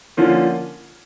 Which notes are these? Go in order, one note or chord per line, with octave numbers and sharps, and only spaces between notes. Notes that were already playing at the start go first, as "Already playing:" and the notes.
D3 F3 A#3 C#4 F4